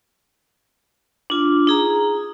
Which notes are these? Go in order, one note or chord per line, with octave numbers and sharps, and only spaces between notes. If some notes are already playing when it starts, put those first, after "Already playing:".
D4 F4
D#4 G#4 A#5